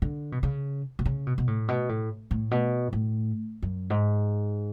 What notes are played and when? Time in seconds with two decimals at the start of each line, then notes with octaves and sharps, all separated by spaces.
0.02 D3
0.32 B2
0.43 C#3
0.99 B2
1.05 C#3
1.27 B2
1.38 B2
1.47 A2
1.68 B2
1.89 A2
2.31 A2
2.51 B2
2.93 A2
3.62 F#2
3.90 G#2